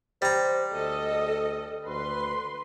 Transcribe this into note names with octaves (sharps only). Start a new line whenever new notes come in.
G3 C5 A#5
D2 A4 D#5
D2 B4 C6